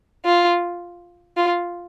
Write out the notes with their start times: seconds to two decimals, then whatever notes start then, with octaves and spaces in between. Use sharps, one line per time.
0.25 F4
1.37 F4